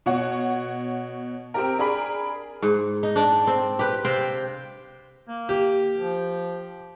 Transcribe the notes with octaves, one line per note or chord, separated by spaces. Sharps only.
B2 C#5 F#5
C4 G4 A#4
D4 G#4 A#4 B5
G#2
D#4
D4 D5
C4
G4 B4
C3 C5 F5 G5
A#3
G4
F3